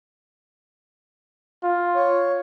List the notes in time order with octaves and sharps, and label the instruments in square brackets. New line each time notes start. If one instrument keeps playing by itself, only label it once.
[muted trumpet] F4
[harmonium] C#5